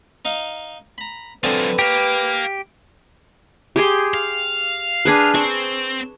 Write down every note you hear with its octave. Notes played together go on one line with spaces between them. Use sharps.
D#4 F5
A#5 B5
D3 F#3 C4 F4 G#4 B4
G4 A#4 C#5 F5
G4 G#4 C6
F5
D4 G#4 B4
C4 C#6